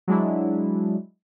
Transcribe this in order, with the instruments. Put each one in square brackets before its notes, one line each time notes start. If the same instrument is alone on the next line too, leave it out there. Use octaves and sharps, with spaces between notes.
[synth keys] F#3 G#3 D4 E4